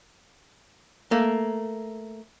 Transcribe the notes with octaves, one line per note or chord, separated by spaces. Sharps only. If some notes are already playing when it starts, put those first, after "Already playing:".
A3 A#3